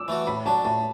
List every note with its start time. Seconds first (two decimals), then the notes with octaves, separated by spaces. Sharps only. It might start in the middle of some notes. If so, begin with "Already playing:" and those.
Already playing: D6 E6
0.08 E3 A3 F#4
0.27 A2 B5
0.46 F#3 D4 A5
0.65 A2 A5